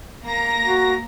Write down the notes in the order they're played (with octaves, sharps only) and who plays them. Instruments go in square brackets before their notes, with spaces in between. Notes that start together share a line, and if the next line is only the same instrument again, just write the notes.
[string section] A#3 A#5 A#6
[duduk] F#4